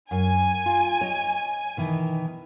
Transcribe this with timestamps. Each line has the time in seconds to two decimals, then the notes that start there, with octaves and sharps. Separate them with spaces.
0.11 F#2 G#5
0.66 F4
1.01 C#5 D#5
1.77 B2 D#3 E3